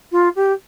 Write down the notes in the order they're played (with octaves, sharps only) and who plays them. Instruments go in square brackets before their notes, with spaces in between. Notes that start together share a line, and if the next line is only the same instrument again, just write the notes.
[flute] F4
G4